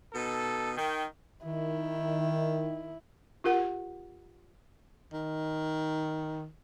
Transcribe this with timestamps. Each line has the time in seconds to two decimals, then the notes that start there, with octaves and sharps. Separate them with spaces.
0.14 B2 D#4 A4
0.77 D#3 G5
1.45 D#3 E4
3.44 F4 G4 A#4 F#5
5.13 D#3